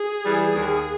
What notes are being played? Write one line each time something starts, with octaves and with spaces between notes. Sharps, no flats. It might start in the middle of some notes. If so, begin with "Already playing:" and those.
Already playing: G#4
E3 G3
D#2